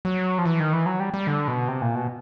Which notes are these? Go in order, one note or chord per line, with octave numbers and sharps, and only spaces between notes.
F#3
F3
E3
D#3
E3
F#3
G3
G3
D3
B2
C3
A#2
B2